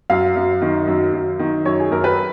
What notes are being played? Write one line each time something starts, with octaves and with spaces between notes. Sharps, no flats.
F#2 F5
F#2
D#3
F#2
F#2
D#3
F#2 C#5
G#4
F#2 A#4
B4